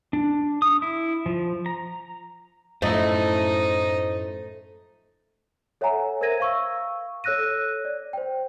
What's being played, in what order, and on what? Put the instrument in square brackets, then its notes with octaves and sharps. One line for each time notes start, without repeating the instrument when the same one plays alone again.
[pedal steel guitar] D4
D#6
E4
F3
A#5
[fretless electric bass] F#2 A2 F3 [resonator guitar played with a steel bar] A3 E4 [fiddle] D#4 [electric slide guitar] C5 D#5
[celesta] A4 C#5 E5 F#5 G#5 A#5
A#4 C5 E5 G#6 A#6 D#7
F5 C#6 E6
A4 C#5 E6 F#6 A#6 D#7
D5
C5 G5